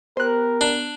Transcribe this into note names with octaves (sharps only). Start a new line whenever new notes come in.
B3 G4 A#4 C5 F#6
D4